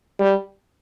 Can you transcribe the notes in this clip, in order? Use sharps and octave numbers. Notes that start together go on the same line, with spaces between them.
G3